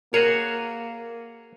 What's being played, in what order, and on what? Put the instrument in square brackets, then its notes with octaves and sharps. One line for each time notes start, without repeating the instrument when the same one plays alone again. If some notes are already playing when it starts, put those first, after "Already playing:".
[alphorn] A#3 [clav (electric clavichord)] F#4 G#4 C#5 [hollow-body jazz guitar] A#4